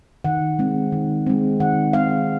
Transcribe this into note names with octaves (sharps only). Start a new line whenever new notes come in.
D#3 F#5
G#3 C4
D#3
G#3 C4
D#3 F#5
G#3 C4 F5